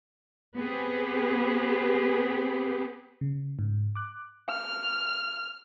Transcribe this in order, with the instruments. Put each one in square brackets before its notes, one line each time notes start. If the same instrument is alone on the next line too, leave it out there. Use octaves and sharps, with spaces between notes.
[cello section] B3 C4 G4 G#4 B4
[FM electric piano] C#3
G#2
D6 F#6
[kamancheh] F6